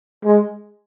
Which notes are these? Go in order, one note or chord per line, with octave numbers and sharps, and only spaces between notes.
G#3